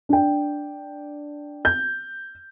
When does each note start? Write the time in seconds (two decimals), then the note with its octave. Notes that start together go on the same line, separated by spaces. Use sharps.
0.09 D4 G5
1.65 G6